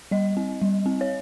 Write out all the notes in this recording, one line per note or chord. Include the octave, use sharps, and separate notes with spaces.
G3 D#5
C4
G3
C4
C#5